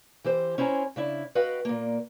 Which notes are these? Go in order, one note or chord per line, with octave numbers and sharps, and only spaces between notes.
E3 G4 C5
C#4 E4 C5 C#5 G#5 A#5
C#3 D4 E4
F#4 B4 D#5 F5 G5
A#2 A#3